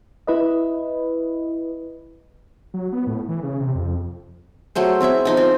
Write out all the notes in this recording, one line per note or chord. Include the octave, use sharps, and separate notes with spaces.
E4 B4 D#5
F#3
B3
A2
E3
C#3
C3
F2
F#3 A3 G#4 C5
C4 E4 G#4 E5
F3 D#4 G#5
C4